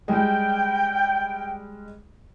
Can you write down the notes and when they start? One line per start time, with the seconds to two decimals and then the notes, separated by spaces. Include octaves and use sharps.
0.08 G3 G#3 G5